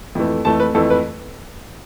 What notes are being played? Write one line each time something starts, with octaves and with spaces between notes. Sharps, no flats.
F2 E3 A3
F2 E3 A3 A5
B4
F2 E3 A3 A4
B4